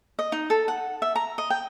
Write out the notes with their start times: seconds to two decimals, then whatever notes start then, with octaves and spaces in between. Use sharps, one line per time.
0.19 D#5
0.32 D#4
0.50 A4
0.68 F#5
1.02 E5
1.15 A#5
1.38 D#5
1.50 G5